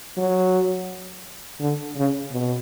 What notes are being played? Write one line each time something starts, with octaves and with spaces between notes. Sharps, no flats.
F#3
D3
C#3
B2